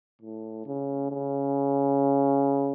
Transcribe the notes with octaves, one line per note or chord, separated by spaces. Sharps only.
A2
C#3
C#3